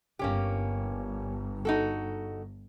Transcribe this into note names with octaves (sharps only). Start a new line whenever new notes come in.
G1 G2 A#3 C#4 G4
D#4 F#4 A4